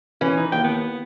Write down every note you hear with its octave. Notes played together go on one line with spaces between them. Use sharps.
E3 C#4
D#4
D#2 G5
B3